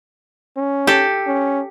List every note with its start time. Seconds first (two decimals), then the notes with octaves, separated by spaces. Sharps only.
0.57 C#4
0.87 G4 A4
1.27 C#4